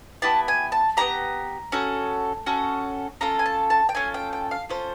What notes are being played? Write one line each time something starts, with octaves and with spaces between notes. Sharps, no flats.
B3 E4 G4 A5
G#5
A5
B3 E4 G4 A#5
C#4 F#4 A4
C#4 F#4 A4
C#4 F4 A4 A#5
G#5
A5
A5
G5
C#4 F4 A4 G#5
G5
G5
F5
C#4 F4 A4 C5